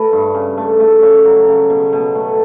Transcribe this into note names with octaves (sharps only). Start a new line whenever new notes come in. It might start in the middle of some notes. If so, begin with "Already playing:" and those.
Already playing: A3 B4
G2
C#3
A3
A3
C#3 C#5
F#3
C#3
B2
B2
A3